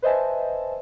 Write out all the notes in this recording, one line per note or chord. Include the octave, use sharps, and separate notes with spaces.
B4 C5 D#5 E5 G#5 A5